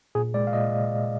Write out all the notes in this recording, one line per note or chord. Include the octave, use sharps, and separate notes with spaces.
A#2 G#4
G#3 D5
F5
A#2 D#5